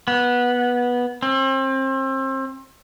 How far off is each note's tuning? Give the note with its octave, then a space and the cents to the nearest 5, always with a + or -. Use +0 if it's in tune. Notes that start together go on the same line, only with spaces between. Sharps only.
B3 -15
C4 +35